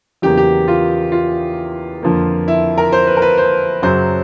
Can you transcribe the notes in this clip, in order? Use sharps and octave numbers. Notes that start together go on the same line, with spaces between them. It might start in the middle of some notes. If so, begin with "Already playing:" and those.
E2 C#3 F#3 A#3 G4
G4
F4
F4
F2 D3 F3 A#3
E4
A#4
C5
B4
A#4
B4
C5
F#2 C#3 F#3 C5